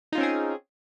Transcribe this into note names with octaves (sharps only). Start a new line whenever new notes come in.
C4 C#4 D#4 F4 G#4